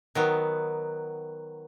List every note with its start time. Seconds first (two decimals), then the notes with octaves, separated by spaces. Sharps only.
0.15 D#3 F#3 B3